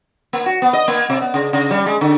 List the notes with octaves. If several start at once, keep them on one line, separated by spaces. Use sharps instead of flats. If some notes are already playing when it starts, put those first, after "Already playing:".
A#3
F#4
B3
D#5
A#3
C3
B3
C#3
C#3
G3
G#3
D3